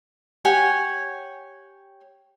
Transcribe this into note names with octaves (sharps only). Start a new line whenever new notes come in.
G4 C#5 F#5 G#5